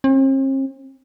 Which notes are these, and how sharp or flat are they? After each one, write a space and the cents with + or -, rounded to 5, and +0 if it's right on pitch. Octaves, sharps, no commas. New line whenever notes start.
C4 +45